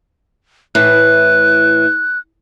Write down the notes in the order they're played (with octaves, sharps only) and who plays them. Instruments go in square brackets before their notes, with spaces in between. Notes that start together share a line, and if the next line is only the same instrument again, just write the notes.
[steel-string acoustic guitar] A2 E3 [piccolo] F#6